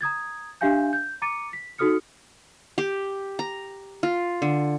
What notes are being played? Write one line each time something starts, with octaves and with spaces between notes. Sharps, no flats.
A#5 D#6 G#6 A6
D4 G4 E5 F5 G#5 G6
G6
A#5 D6 A6 C#7 D#7
B6
D#4 F#4 A4 D#6 F6 C#7
G4
A#5
F4
D3